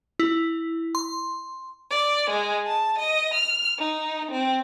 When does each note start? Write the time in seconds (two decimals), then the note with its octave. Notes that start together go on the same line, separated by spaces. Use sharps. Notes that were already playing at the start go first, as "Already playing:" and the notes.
0.19 E4
0.95 C6
1.91 D5
2.30 G#3
2.67 A5
2.99 D#5
3.35 F6
3.79 D#4
4.31 C4